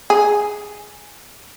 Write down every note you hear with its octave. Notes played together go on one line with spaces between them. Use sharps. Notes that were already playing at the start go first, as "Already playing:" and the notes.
G#4